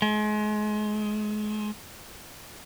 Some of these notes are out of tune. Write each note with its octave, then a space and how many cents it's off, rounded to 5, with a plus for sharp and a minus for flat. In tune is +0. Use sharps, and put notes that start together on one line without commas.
G#3 +30